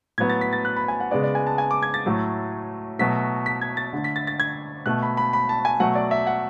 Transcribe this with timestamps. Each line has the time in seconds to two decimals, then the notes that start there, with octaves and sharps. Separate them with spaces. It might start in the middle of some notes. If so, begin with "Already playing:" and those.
0.18 A2 F#3 B3 G#6
0.30 A6
0.41 B6
0.53 A6
0.65 F#6
0.76 B5
0.88 G#5
1.00 F#5
1.11 C#3 G#3 B3 D5
1.23 D5
1.35 G#5
1.47 A5
1.58 G#5
1.71 D6
1.83 G#6
1.94 A6
2.06 A2 F#3 A3
2.99 B2 F#3 A3 B6
3.46 B6
3.61 G#6
3.77 A6
3.93 D3 A3
4.04 B6
4.16 A6
4.27 A6
4.40 G#6
4.86 B2 A3 F#6
5.02 B5
5.17 B5
5.33 B5
5.49 A5
5.65 G#5
5.80 B2 F#3 A3 F#5
5.95 D5
6.11 E5
6.27 F#5